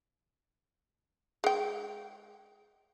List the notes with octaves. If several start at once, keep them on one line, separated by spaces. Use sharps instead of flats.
G#3 G5